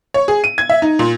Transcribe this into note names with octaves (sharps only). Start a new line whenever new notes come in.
C#5
G#4
D#7
G#6
E5
D#4
A#2